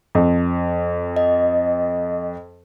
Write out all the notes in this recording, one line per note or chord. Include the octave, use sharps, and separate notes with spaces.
F2
D#5